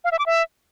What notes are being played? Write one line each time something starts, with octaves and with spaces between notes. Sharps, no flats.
F5
E5
D6
E5